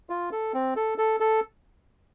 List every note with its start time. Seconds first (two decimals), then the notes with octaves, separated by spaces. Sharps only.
0.10 F4
0.32 A4
0.54 C4
0.76 A4
0.98 A4
1.20 A4